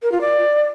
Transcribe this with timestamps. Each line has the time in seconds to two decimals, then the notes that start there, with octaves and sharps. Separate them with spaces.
0.03 A#4
0.12 F4
0.21 D5